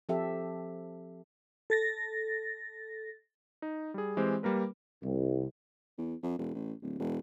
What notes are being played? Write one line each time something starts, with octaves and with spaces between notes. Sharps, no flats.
F3 C4 G4 A4 E5
A4 A6 A#6
D#4
G3 G#4
E3 G#3 C4 G4 C5
G3 A#3 A#4 B4
C2
E2
F2
E1
A1
D1
E1